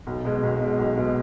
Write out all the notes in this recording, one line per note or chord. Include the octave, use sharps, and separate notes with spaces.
B1
B2 G#3
B1
B2 G#3
B1
B2 G#3